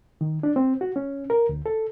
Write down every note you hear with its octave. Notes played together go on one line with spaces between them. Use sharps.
D#3
D4
C4
F#4
C#4
A#4
D2
A4